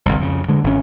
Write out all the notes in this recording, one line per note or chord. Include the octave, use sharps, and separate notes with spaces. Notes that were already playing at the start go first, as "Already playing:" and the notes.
G1 C2
F2 C#3
D3 G#3
G#1 C#3 C#4